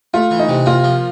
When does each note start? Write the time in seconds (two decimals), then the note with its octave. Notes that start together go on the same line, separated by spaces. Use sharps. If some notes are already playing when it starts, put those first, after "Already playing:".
0.14 A3 F4
0.31 E3
0.39 D#4
0.49 C3
0.66 A#3 F4
0.84 F3